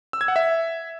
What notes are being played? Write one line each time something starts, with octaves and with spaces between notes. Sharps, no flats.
E6
G#6
F#5
E5